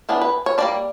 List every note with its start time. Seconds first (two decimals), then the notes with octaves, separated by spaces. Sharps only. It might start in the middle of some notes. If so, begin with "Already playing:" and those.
0.09 E3 B3 D4
0.22 B4
0.46 C#5
0.58 G3 A#3 D4 D5